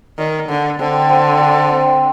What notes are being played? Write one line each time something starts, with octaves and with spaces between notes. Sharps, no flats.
D#3 D5
D3 D4
D3 C4
C4
C5
C4